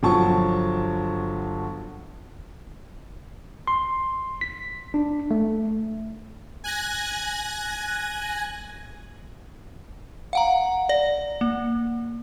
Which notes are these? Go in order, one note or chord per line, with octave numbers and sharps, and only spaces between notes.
G1 F3 F#3 A5 C#6
C6
B6
D4
A3
G#5 F#6 G#6 A#6
F5 F#5 A#5
D5
A#3